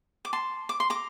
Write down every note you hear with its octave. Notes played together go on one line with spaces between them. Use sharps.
D6
A5 C6
D6
C6
A#5 D6